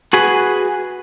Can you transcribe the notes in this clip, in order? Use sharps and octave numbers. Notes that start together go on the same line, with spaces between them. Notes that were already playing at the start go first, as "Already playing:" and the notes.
F#4 G#4 B4